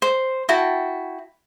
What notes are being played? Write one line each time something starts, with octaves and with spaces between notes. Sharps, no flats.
C5
E4 F#4 G5 A5